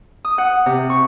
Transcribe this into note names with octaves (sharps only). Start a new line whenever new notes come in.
D#6
F#5
C3
C#6